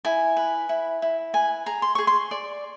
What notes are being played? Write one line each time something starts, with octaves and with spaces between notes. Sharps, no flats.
E4 G#5
B4
E4
E4
B4 G#5
G#4 A#5
C6
G#4 C#6
C6
D5